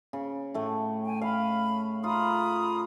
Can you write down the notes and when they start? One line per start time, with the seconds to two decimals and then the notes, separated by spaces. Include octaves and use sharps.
0.13 C#3
0.54 A2 A3
1.03 G5 G#5
1.21 F5 B5
2.04 F4 A#5 B5 D#6